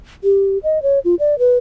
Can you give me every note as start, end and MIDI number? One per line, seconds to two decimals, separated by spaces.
0.24 0.58 67
0.63 0.82 75
0.83 0.99 73
1.05 1.15 65
1.20 1.38 74
1.39 1.58 71